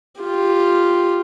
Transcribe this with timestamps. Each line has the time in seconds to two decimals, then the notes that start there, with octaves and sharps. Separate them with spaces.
0.21 F4 G4